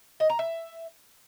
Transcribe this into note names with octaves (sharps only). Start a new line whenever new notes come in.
D#5
A#5
E5